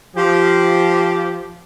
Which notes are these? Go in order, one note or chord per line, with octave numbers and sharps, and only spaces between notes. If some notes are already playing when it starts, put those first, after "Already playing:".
F3 G4